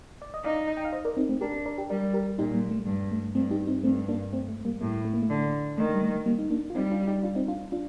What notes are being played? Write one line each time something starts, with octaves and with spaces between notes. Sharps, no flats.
D5
D#5
D#4 D5 F5
G5
F5
C5 D#5
A#4 D5
C4 D#4
A3 C4
D4 G4 A#4
A#4 D5
G4 A#4
G3 A#4 D5
G4 A#4
A#2 D#4 G4
G3 A#3
G3
A3
G2 G3
A3
G2 A3 C4
D#4 G4
C4 D#4
G2 A3 C4
A#3 D4
A3 C4
A3
G3 A#3
A2 G3 A#3
A3
A#3
A3
D3
D#3 A3
G3
A3
G3 A#3
D#4
A#3 D4
F4
G3 C4 D#4
D4 F4
D#4 G4
D4 F4
C4 D#4
D4 F4
D4 F4